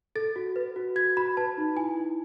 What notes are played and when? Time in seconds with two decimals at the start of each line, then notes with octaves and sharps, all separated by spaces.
0.16 A4 A6
0.36 F#4
0.56 B4
0.76 F#4
0.96 F#4 G#6
1.17 F#4 B5
1.37 B4 A5
1.57 D#4
1.77 E4 G#5
1.97 E4